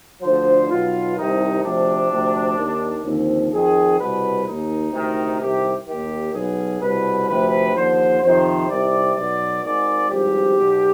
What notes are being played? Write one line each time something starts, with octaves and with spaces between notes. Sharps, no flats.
D2 D3 F3 C5
B1 B2 F4
C2 C3 D#3 D#4
D2 C3 F3 D4
D2 C3 F3
D#2 D#3
D#2 D3 F3 C4
F2 D#3 G#4
C2 B2 B4
D#2 D#3 D#4
D2 C3 D#3
C2 C3 D#3 G4
D#2 D#3 G4
B1 B2 G#4
C2 B2 B4
D2 C3 F3 B4
D#2 D3 F3 C5
F2 C3 D#3 C5
C2 C3 D#3 D5
B1 B2 D5
G#1 G#2 D#3 D5
G#1 G2 F3 G4
B1 B2